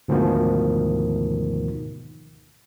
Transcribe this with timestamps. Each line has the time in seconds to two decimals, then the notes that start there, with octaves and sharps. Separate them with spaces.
0.08 D2 G#2 B2 D#3 F3